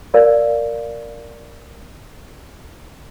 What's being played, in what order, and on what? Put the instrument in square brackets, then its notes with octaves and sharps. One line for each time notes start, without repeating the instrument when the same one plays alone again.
[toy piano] A#4 D5 F5